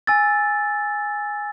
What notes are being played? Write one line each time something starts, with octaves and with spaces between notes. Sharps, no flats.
G#5 E6 A6